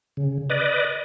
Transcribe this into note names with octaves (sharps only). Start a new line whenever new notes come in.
C#3
B4 D5 D#5